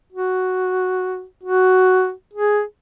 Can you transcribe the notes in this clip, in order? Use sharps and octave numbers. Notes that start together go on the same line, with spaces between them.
F#4
F#4
G#4